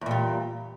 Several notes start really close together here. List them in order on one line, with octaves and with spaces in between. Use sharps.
E2 A#2 G3